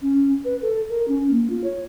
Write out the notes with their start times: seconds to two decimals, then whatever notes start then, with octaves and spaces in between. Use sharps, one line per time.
0.02 C#4
0.45 B4
0.62 A4
0.90 A#4
1.08 C#4
1.31 A#3
1.50 F4
1.64 C#5